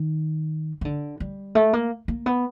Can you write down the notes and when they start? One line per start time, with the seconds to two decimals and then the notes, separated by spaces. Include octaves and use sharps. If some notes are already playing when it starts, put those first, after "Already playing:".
Already playing: D#3
0.81 D#3
0.85 D3
1.20 G3
1.55 A3
1.73 A#3
2.08 A#3
2.26 B3